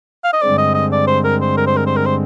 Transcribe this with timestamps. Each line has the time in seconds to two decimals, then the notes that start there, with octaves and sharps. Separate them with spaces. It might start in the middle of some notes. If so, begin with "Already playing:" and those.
0.24 F5
0.33 D#5
0.42 G2 D3 G#3 C4 D5
0.58 D#5
0.74 D#5
0.92 D5
1.07 C5
1.24 A#4
1.41 C5
1.57 A#4
1.67 C5
1.76 A#4
1.86 C5
1.96 A#4
2.06 C5